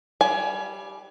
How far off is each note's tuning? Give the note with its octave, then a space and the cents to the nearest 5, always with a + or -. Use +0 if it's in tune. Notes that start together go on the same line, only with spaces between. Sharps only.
G3 +0 G#5 +20